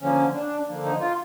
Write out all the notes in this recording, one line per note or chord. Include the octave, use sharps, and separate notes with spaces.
D3 F3 A#3 C#4
D4
D3 F3 A#3
D#4
F4